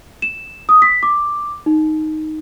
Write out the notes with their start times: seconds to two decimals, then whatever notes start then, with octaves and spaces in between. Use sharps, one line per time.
0.22 E7
0.69 D#6
0.82 B6
1.03 D6
1.66 D#4